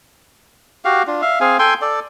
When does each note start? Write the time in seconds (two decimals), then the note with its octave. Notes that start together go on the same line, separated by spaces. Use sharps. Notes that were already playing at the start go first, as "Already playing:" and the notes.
0.85 F#4 G4 F5
1.07 D4 F4
1.22 E5 F5
1.41 C4 G#4 F5 G#5
1.59 A4 G5 G#5 C6
1.81 A4 D5